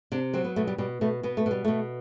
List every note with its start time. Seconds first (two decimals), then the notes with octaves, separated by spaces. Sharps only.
0.12 C3 D4
0.34 F#3 C4
0.44 B3
0.56 B2 A3
0.67 G3
0.78 B2 G3
1.01 B2 A3
1.23 B2 B3
1.37 A3
1.46 B2 G3
1.65 B2 A3